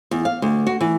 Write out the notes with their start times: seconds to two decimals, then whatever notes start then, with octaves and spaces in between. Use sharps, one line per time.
0.11 E2
0.25 F5
0.42 D2
0.67 F#4
0.81 E3